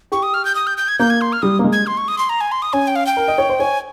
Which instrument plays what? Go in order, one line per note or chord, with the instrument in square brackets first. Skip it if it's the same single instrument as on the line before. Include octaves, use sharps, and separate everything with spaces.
[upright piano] G4 [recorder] C#6
[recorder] D#6
F6
G6
D#6
G6
G6
G#6
[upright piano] A#3 [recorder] G6
[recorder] G#6
C6
F6
[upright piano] G3 [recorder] D#6
[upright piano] A#3
G#3
[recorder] G#6
C6
C#6
D#6
C6
A#5
G#5
C6
D#6
[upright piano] C#4 [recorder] G#5
[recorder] G5
F5
G5
[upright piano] A#4
D#5
C#5
C5
[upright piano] C#5 [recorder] G#5